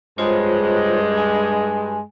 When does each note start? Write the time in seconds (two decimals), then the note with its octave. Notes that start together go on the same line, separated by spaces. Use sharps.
0.18 G2 G#3 F4 C5 C#5
1.18 G#5